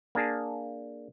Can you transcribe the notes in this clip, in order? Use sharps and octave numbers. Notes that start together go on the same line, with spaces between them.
A#3 D4 G#4 A5